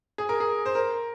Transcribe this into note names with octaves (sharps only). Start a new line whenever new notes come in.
G#4
A#4
G#4
C5
A#4